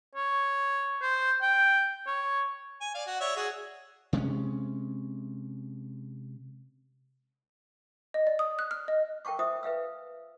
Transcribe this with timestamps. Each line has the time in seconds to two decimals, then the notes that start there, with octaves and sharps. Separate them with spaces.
0.15 C#5
1.01 C5
1.41 G5
2.07 C#5
2.81 G#5
2.95 D5 F5
3.07 F#4
3.20 C#5 D5 E5
3.36 F#4 G#4
4.13 C3 G#3 A3 C#4
8.14 D#5
8.27 D5
8.39 D#6
8.59 F#6
8.71 F6
8.88 D#5
9.25 A#4 G5 A5 C#6 D6
9.39 F4 C5 E5 D#6
9.63 B4 E5 F5 E6